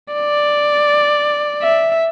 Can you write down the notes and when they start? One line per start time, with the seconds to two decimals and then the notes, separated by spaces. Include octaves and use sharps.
0.14 D5
1.62 E5